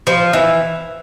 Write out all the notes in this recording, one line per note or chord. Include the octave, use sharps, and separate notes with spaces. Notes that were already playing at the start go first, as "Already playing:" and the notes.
F3
E3